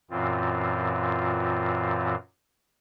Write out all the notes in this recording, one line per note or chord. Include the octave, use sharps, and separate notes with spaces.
F#2 A#2 E3 C4 F4